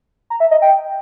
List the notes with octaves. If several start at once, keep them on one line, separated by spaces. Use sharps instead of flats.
A#5
E5
D#5
G5